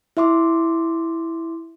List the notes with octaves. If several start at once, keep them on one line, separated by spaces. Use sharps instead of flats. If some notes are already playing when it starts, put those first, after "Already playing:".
E4 E5 C6 D6